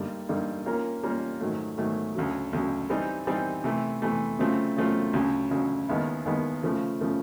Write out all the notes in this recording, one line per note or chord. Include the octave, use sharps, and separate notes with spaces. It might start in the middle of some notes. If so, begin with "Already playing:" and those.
Already playing: G2 D3 G3 A#3 D#4
G2 D3 G3 A#3 D#4
G3 A#3 C#4 F4 A#4
G3 A#3 C#4 F4 A#4
G#2 D#3 F#3 A3
G#2 D#3 F#3 A3
D2 C#3 F#3
D2 C#3 F#3
E3 G3 C4 D#4
E3 G3 C4 D#4
C3 E3 A3
C3 E3 A3
C#3 F#3 A3 C4 F4
C#3 F#3 A3 C4 F4
D2 C#3 F#3
D2 C#3 F#3
D#2 D#3 G#3 B3 E4
D#2 D#3 G#3 B3 E4
C#3 F3 A3
C#3 F3 A3